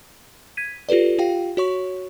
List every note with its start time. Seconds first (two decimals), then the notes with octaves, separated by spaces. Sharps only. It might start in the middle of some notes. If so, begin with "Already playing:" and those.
0.57 G#6 B6 D#7
0.89 F4 G4 A4 B4 D5
1.18 F4 G4 F5 G5
1.57 F#4 C#5 C#6